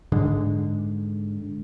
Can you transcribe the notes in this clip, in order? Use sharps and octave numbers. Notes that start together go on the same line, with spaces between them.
G#2 D3 G#3